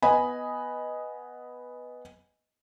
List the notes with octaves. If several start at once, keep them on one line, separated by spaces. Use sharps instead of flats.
B3 D#5 G#5 B5